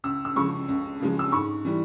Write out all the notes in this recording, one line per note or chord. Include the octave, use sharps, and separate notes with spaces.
C#2 E6
E6
C#3 F3 G#3 C#6
C#2
C#3 F3 G#3
E6
G#2 C#6
E3 G3